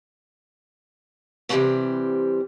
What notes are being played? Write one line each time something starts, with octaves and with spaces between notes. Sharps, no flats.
C3 E3 F#3 G3 A3 C4